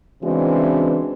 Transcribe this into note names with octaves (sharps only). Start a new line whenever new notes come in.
C#3 E3 G#3 C4 D4 F#4